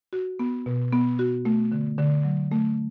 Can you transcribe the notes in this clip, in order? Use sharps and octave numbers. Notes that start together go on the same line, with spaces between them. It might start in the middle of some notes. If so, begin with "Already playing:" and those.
F#4
B3
B2
B3
F#4
A3
D3
D3
F#3
A3